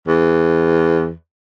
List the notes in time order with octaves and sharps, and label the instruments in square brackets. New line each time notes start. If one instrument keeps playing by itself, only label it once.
[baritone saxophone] E2